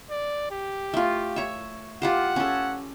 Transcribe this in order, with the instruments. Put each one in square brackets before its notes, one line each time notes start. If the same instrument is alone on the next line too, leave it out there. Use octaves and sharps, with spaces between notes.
[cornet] D5
G4
[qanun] A3 F4
C#5 E5
[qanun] F4 G4 C5 [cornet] F#5
[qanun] C#4 A4